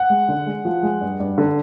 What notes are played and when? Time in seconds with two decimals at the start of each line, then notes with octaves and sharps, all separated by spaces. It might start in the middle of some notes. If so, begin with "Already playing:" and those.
Already playing: F#5
0.10 G#3
0.29 D3
0.46 G#3
0.65 F3
0.83 G#3
1.01 G2
1.20 G2
1.38 D3